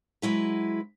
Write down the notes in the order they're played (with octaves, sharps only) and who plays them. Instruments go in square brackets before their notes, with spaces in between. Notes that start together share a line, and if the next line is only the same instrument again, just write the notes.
[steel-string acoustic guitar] F#3 G#3 E4 B4